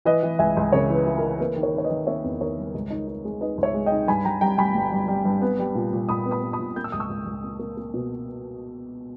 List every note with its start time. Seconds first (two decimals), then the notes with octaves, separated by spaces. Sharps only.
0.05 E3 B4 D#5
0.23 E3
0.39 C#2 E5 G#5
0.57 C#2
0.72 C#3 A#4 C#5
0.90 E3
0.95 B4
1.07 E3
1.18 A#4
1.23 E3
1.40 A#3 B4
1.56 D#3
1.63 A#4 C#5
1.74 D#3 C#5
1.84 B4 D#5
1.90 D#3
2.07 A#3 C#5 E5
2.24 E2
2.41 D#3 A#4 C#5
2.58 G3
2.74 C#2
2.90 D#4
3.08 D#4
3.25 G#3
3.41 D#4 B4 D#5
3.58 C#2
3.63 C#5 E5
3.74 G#3
3.86 D#5 G5
3.92 D#4
4.08 G2 G#5 B5
4.25 G2 G5 A#5
4.41 G3 G5 A#5
4.58 G3 G#5 B5
4.75 G1
4.92 G3
5.08 G3
5.25 G2
5.42 B3
5.59 G3
5.75 A#2
5.93 A#2
6.09 A#2 B5 D#6
6.26 B3
6.31 B5 D#6
6.43 B3
6.53 B5 D#6
6.59 A#2
6.76 A#3 G6
6.84 E6
6.92 C#2 D#6
7.00 C#6 E6
7.10 C#2
7.26 C#2
7.43 A#3
7.59 A#3
7.77 A#3
7.94 B2